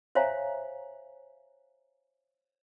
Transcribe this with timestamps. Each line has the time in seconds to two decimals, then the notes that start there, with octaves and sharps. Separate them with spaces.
0.15 C5 C#5 E5 F5 G#5 A#5